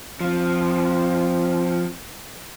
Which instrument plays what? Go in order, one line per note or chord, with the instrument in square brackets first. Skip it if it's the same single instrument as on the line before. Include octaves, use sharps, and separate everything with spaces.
[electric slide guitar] F3 [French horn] C4